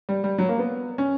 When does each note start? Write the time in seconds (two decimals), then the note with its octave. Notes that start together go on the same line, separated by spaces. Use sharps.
0.09 G3
0.24 G3
0.38 F#3
0.49 A#3
0.59 B3
0.98 C#4